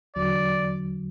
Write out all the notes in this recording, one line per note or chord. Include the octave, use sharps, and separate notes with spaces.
E2 D3 F#3 D5